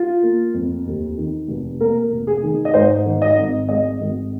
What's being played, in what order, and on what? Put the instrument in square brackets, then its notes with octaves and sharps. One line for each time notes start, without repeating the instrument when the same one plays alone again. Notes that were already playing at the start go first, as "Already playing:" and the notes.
Already playing: [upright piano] F4
A#3
F2
D#2
D#3
F1
A#3 A#4
F1
G#4
D#3
D#5
G#2 C5
D#3
D#5
G#1
G#3 D#5
G#1